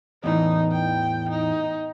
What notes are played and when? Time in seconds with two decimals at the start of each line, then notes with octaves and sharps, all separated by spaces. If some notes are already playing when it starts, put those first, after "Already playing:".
0.24 E2 A2 E3 D#4
0.73 G5
1.30 D#4